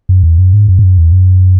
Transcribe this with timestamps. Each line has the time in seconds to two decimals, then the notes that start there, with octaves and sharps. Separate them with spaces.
0.09 F#2
0.23 E2
0.38 F#2
0.53 G#2
0.68 F#2
0.79 G#2
0.83 F#2
0.98 E2
1.12 F#2